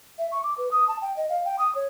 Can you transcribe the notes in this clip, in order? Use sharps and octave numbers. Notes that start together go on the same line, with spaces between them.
E5
C#6
D6
B4
D#6
A5
G5
D#5
F5
G5
D#6
C#5